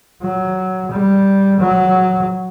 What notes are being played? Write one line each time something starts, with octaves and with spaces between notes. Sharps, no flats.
F#3
G3
F#3